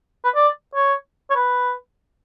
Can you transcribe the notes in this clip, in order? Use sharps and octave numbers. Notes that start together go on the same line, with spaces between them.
B4
D5
C#5
C#5
B4